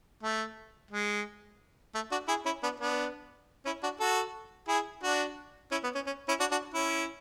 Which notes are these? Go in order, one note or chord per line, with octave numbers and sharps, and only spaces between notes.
A3
G#3
A3
D4 F#4
E4 G#4
C#4 E4
B3 D4
B3 D4
C#4 E4
D4 F#4
F#4 A4
E4 G#4
D4 F#4
C#4 E4
B3
C#4
C#4
C#4 E4
D4 F#4
D4 F#4
C#4 E4